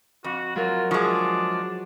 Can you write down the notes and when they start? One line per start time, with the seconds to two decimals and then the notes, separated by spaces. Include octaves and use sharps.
0.24 F2 F#4
0.56 F#3 F4 A#4
0.91 F3 G#3 D4 C#6